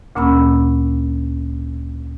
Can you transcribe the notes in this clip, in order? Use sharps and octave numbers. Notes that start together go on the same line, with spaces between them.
D2 A#2 A#3 C#4 B5 E6